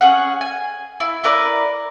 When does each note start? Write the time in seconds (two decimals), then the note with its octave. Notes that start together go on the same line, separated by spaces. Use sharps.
0.01 C#4 G#4 F#5
0.41 G#5
1.00 E4
1.24 E4 A#4 B4 D5